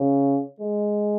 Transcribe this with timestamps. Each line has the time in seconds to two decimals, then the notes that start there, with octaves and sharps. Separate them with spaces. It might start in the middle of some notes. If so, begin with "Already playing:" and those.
Already playing: C#3
0.60 G#3